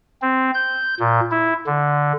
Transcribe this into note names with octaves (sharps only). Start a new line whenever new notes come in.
C4
G6
A#2
E4
D3